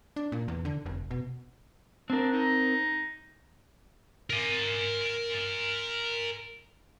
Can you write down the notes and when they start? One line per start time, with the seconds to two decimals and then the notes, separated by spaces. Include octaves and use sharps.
0.16 D4
0.32 A#2
0.48 E2
0.65 D3
0.86 F1
1.11 B2
2.10 C4 D4 A#4
2.32 D#4
4.30 A#4 G#5